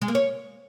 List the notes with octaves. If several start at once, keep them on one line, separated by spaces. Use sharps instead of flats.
G#3
A#3
C#5